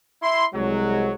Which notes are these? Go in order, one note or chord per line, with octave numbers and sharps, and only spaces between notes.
E4 C6
C2 F#3 G#3